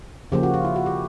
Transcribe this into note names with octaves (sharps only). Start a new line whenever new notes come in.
C#3 F3 A#3 G4
F#4
F4
E4
F#4
G4